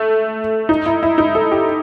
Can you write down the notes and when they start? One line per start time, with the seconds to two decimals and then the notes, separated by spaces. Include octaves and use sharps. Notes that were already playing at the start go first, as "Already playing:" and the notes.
Already playing: A3
0.69 D#4
0.86 E4
1.03 E4
1.18 D#4
1.35 A4
1.52 G4